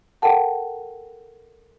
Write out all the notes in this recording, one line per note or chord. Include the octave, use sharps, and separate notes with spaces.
A4 A#4 F#5 G5 A5